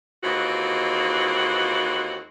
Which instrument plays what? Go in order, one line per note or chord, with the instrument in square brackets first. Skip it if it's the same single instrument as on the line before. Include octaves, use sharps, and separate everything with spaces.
[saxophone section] D#2 E3 G#3 C4 F4 F#4